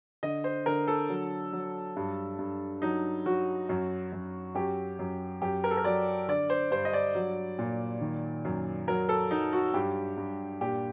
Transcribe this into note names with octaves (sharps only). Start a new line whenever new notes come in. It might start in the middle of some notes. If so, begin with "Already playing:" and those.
D3 D#5
C5
D3 A#4
A4
F#3
F#3
G2
G2
F#3 D#4
F#3 F#4
F#2
F#2
F#2 G4
F#2
F#2 G4
A#4
A4
A#4
F#3 D5
D3 D5
C5
G2 C5
D#5
D5
F#3
A#2
D#3
F#2
F#3 A#4
A4
F#3 D#4
F#4
G2 G4
G2
A#2 G4